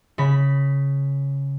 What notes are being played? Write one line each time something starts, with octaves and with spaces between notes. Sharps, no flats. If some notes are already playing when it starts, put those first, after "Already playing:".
C#3 B5 B6